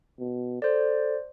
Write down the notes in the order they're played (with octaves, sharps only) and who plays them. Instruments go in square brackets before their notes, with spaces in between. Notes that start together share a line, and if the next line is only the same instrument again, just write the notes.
[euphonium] B2
[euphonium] A4 [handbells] C5 D5